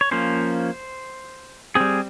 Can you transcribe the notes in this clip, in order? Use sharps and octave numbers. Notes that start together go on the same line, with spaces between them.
C#5
F3 A#3 C#4 C5
G3 C4 G#4